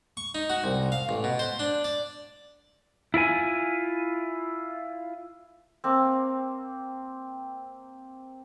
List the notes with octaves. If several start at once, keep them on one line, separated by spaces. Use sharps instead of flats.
C#6
D#4
F#4
C2
F5
A1
B2
C5
D4
D5
E4 F4 A#4 G#5
A#3 C4